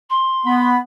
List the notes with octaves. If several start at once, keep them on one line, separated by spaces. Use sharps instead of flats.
C6
B3 B5